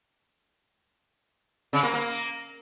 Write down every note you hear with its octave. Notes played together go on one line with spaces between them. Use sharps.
C#3
A#3
A#3